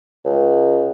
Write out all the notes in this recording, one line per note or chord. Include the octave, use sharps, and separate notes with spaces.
C#2